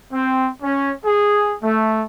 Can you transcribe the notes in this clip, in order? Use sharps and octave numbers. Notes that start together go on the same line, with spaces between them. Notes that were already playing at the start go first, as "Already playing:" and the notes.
C4
C#4
G#4
A3